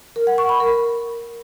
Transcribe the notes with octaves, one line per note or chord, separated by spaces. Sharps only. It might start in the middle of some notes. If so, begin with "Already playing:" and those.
A#4
F#5
C#6
B5
A#4